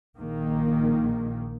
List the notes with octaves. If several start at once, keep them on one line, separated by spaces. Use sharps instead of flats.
A#1 D#3 A#3